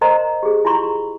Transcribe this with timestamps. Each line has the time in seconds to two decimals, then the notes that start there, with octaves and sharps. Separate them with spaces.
0.01 A#4 C5 D#5 A#5 C6
0.43 G4 G#4
0.65 E4 F4 A#5 C6 C#6